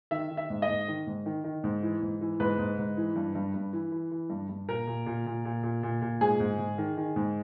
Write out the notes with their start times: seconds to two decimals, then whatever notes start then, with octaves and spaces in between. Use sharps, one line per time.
0.11 D#3 E5
0.31 D#3
0.37 E5
0.50 G#2
0.62 D#5
0.68 G#2
0.88 D#3
1.07 G#2
1.26 D#3
1.44 D#3
1.64 G#2
1.83 E3
2.02 G#2
2.21 E3
2.40 G#2 B4
2.59 G#2
2.78 G#2
2.97 E3
3.16 G2
3.35 G2
3.54 G2
3.73 E3
3.92 E3
4.11 E3
4.30 G2
4.49 G2
4.68 A#2 A#4
4.87 A#2
5.06 A#2
5.26 A#2
5.45 A#2
5.63 A#2
5.83 A#2
6.02 A#2
6.21 G#2 G#4
6.40 G#2
6.58 G#2
6.78 D#3
6.97 D#3
7.16 G#2